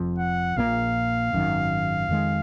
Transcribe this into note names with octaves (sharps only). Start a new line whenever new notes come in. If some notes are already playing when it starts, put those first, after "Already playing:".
Already playing: F1 F2 F3
F#5
A#1 A#2 F3 A#3 F5
G#1 F#2 D#3
F2 D#3 G#3